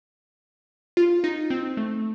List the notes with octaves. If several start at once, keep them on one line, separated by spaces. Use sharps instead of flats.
F4
D#4
C4
A3